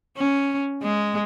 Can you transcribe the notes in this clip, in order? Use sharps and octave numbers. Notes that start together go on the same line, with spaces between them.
C#4
G#3